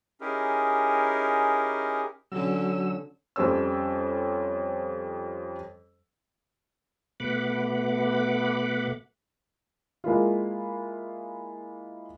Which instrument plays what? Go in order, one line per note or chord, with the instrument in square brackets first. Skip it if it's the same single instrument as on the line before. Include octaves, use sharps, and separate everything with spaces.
[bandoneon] C#4 D#4 E4 G4 G#4 A#4
[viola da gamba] D3 C#4 [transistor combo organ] F#3 E6
[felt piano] F2 G3 C#4 C5 C#5 E6
[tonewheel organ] B2 A3 B3 F#5 B5 D6
[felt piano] G#3 A#3 E4 F4